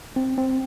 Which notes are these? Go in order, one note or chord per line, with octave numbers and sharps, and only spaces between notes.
C4
C4